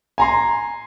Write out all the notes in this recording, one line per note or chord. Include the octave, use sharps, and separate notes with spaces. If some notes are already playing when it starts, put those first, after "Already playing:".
G#5 A#5 C6